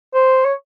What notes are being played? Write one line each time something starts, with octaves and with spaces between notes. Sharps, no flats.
C5
C#5